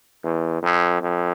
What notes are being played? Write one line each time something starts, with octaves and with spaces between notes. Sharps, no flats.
E2
F2
F2